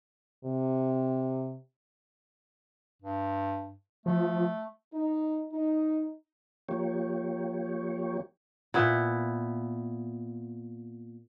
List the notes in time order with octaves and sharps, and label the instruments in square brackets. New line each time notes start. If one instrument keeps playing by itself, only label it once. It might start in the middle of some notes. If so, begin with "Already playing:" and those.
[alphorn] C3
[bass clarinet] G2
[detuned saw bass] F3 [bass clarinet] A3
[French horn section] D#4
D#4
[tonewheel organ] F3 A#3 G4 C#5
[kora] A#2 B3 E4